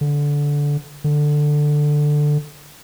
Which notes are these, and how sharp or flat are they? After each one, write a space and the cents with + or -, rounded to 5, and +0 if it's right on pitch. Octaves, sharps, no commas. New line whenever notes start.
D3 -15
D3 +10